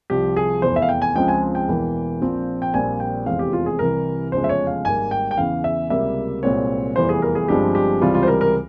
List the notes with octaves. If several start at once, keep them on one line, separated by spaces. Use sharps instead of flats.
C2 C3 F3 G4
G#4
F1 E2 E3 C5
E5
F5
G5
G#5
C#2 C#3 F3 G#3 C4 G5
G#5
G5
E1 E2 E3 A#3
A#1 A#2 F3 C4
G5
A#1 A#2 G3 C4 G#5
G5
F1 E2 E3 G#3 C4 F5
G4
F4
G#4
C2 C3 E3 G3 A#4
F1 E2 C#3 F3 G#3 C5
E5
C#5
F5
G#1 G#2 G3 A#3 G#5
G5
G5
E2 C#3 E3 F5
E5
C#2 C3 G3 A#3 E5
C2 A#2 G#3 C4 C#5
F1 E2 E3 G3 C5
G#4
A#4
G#4
G1 G2 F3 G#3 C4 G4
G4
C#2 C3 E3 G3 C4 F4
F4
C5
A#4
A#4